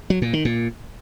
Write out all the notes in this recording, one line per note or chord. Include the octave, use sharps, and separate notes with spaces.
F#3
A#2
D#3
A#2